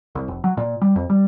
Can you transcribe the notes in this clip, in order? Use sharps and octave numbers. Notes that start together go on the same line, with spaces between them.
C2
F1
F#3
A#2
G3
F2
G3